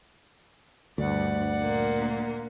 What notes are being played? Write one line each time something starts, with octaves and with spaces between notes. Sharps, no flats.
D2 G2 D5 F#5
A#2 A#3